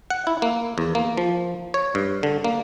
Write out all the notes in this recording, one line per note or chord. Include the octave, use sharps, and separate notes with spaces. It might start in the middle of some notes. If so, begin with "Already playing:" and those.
F#5
E4
A#3
E2
A#3
F3
C#5
G2
D3
A#3